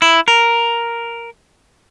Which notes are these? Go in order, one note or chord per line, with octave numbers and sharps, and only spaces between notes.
E4
A#4